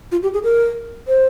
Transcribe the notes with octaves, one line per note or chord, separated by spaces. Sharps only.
F4
G4
G#4
A#4
C5